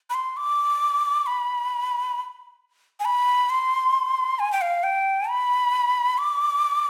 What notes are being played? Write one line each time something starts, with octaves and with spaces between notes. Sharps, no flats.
B5
C6
D6
B5
G#5
B5
C6
G#5
G5
F5
G5
B5
D6